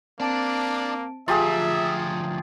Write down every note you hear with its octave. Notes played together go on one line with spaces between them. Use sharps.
A#3 C4 D4 A5 D7
D2 F3 F4 G4 G#4 E5 A#5